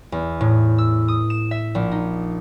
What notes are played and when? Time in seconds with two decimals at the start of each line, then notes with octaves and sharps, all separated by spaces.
0.12 E2
0.41 A2
0.78 E6
1.08 D#6
1.30 E7
1.51 E5
1.75 A#1
1.91 D#4